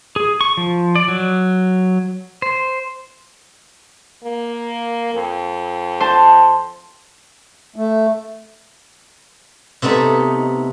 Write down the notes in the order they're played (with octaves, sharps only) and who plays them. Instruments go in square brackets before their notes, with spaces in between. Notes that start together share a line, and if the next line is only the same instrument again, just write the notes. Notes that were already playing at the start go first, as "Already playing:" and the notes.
[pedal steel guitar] G#4
C#6
F3
D5
F#3
C5
[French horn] A#3
F2
[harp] C5 A5
[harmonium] A3
[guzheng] C3 A3 B3 D#4